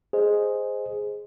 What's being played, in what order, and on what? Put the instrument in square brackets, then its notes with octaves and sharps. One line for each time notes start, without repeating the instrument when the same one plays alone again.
[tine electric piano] G#4 C5 D#5